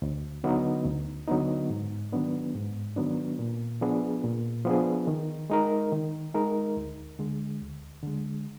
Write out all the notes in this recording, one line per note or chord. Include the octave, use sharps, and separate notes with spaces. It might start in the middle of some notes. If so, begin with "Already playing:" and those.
D2
D3 F#3 B3 D#4
D2
D3 F#3 B3 D#4
G#2
D#3 F#3 B3 D4
G#2
D#3 F#3 B3 D4
A#2
F3 B3 D4 G#4
A#2
F3 B3 D4 G#4
D#3
G#3 D#4 A#4
D#3
G#3 D#4 A#4
D2
D3 G#3
D2
D3 G#3